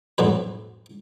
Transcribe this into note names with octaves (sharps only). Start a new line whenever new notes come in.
B1 F2 A2 F#3 B4